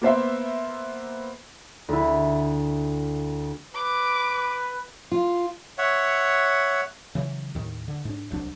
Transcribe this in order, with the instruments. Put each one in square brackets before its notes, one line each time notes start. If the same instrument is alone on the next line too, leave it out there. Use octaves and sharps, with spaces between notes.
[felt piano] A#3 B3 C5 E5
[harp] D2 E4
[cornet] B4 [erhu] D6
[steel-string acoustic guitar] F4
[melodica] C#5 E5 F#5
[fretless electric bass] C#3 E3 F#3
D#2 A2 D#3
D3
G#2 D4
D1 C2 F#3 D4